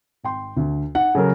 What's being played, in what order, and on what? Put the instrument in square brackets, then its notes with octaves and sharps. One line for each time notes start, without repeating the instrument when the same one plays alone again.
[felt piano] G#1 G5 C6
D2 D3
[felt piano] D#4 [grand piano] F#5
[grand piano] C#3 F#3 A#4 [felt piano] A4